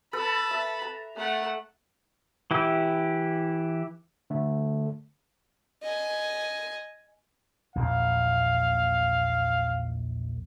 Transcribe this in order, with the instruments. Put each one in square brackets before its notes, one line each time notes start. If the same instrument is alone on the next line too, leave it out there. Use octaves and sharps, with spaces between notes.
[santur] A4 B4 [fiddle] A5 B5
[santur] E5
A#5
[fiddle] A3 F#5
[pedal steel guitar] E3 E4 G4
[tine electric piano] D3 A3
[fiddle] D#5 G#5
[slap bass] A#1 E2 A#2 [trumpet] F5